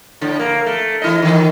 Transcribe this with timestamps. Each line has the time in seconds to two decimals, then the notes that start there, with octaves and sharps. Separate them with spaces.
0.21 A2 D3
0.39 A#3
0.66 A3
1.02 E3 E4 D#5
1.22 D#3 E3